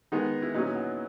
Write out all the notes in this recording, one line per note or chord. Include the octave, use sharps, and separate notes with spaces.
D#3 G#3 B3 D#4
E4
A#2 F#3 C#4 D#4
B3